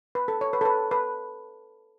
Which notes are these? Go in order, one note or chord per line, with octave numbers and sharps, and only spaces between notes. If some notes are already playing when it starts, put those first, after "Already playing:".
B4
A4
C#5
B4
A4
B4
B4